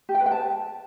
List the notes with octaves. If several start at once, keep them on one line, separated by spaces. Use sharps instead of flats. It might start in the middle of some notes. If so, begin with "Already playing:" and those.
G4
G5
B4
G5
A5